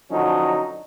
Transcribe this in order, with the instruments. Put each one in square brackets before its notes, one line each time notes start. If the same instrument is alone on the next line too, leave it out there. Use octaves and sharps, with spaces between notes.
[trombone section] D3 F3 F#3 C#4 D#4